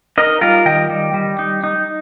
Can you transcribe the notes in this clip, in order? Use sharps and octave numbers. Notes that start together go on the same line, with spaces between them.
D#4 A#4 D#5
G3 F4 A#4
D#3 D#5 G5
G3
G3
D#4
D#4